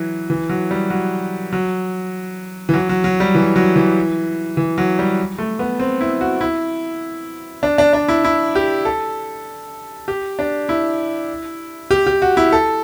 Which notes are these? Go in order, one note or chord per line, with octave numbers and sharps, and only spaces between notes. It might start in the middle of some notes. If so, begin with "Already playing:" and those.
Already playing: E3 F#3
E3
F#3
G3
F#3
F#3
E3
F#3
F#3
F#3
G3
E3
F#3
E3
E3
F#3
G3
A3
B3
C4
E4
F#4
E4
D4
D4
D4
E4
E4
G4
A4
G4
D4
E4
G4
G4
F#4
E4
A4